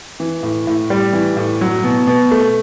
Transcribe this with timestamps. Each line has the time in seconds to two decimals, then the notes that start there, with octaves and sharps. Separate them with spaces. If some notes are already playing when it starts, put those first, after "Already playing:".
0.20 E3
0.43 A2
0.67 A2
0.90 G3
1.13 E3
1.37 A2
1.61 F#3
1.84 B2
2.07 B2
2.32 A3